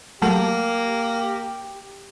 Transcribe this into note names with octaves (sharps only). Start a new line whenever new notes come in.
F#3 A3 A#3 G4